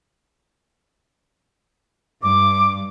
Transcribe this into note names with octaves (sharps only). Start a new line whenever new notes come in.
G2 D6